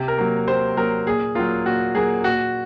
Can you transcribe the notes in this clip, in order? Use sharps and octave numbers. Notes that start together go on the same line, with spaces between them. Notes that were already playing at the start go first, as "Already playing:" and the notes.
Already playing: C3
A#4
F#3 A#3
C3 C5
F#3 A#3 A#4
A#2 G#4
F#3 A#3 F4
A#2 F#4
F#3 A#3 G#4
A#2 F#4